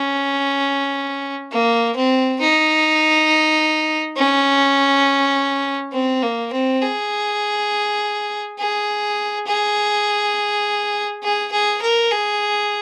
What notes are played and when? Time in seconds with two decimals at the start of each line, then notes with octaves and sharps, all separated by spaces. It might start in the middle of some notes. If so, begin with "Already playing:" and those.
Already playing: C#4
1.52 A#3
1.96 C4
2.41 D#4
4.17 C#4
5.93 C4
6.23 A#3
6.53 C4
6.82 G#4
8.59 G#4
9.47 G#4
11.23 G#4
11.52 G#4
11.82 A#4
12.12 G#4